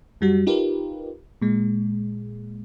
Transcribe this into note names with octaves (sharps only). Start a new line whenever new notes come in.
F#2 G3 F#4
D#4 F4 G4 A#4 B4
A#2 G#3